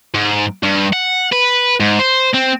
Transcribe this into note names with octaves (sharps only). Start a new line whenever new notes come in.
G#2
G2
F#5
B4
G#2
C5
C4